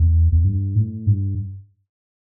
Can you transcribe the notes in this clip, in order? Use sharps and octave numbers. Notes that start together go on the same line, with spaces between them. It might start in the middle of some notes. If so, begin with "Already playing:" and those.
Already playing: E2
E2
G2
A2
G2